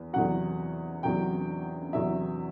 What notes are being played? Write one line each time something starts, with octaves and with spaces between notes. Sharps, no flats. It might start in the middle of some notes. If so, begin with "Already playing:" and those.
Already playing: E2
E2 C3 F#3 F#5
E2 C3 F#3 G5
E2 C3 F#3 E5